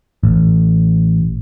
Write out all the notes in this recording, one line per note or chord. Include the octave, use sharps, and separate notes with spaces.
A1